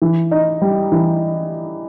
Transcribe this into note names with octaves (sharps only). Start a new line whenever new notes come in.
E3
D#4
G3
E3